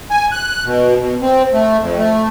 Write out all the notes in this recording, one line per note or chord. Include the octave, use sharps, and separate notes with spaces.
G#5
F#6
B2
B2
C4
A3
F2
A3